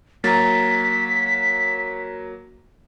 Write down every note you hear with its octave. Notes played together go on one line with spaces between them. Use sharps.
F#3 A#3 A#5 A6 B6